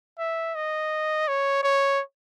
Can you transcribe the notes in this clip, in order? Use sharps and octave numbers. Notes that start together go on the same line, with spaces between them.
E5
D#5
C#5
C#5